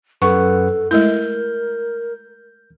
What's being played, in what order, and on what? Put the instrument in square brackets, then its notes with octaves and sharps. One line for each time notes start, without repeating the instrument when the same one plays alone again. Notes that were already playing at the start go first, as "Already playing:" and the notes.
[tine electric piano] F#2 B4 F#5 [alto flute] A4 [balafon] C#6
[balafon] G#3 A3 E4 [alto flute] A#4 [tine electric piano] G6